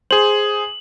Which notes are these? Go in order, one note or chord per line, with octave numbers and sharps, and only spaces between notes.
G#4 C5 F#7